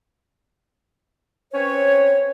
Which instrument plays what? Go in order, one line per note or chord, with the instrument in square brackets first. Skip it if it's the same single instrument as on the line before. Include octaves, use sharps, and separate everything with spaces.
[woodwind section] C4 C#4 B4 C#5